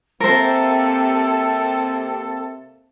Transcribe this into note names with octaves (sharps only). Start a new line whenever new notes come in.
C3 A#3 C4 A4 A#4 C5